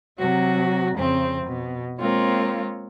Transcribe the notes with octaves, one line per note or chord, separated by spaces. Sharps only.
C3 F#3 F#4
F2 C#3 C4
B2
G#3 A#3 C4 F4 C#5